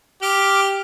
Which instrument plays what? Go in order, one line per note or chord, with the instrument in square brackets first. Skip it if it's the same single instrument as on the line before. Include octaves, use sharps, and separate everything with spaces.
[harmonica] G4 [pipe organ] D6 F6